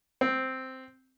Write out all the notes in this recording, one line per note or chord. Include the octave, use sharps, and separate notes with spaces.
C4